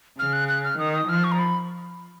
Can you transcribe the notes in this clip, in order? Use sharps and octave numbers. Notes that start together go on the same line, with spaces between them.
C#3 F6
F#6
F#6
F6
D#3 D#6
D#6
F3 F6
C#6
A#5
B5